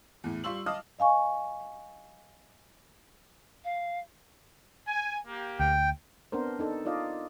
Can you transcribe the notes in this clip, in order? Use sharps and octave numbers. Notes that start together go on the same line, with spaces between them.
E2 A2
G3 F4 C6 C#6 E6 F#7
D#5 F5 A5 D6 D#6 F6
D#5 F5 G#5 C#6
F5
G#5
A#3 G4
D2 G5
B3 C4 D4 A#4 C5
D4 D#4 A4
D#4 F4 D5 D#5 F5